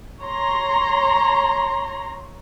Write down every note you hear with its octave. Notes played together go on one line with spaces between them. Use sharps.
C#5 A#5 C6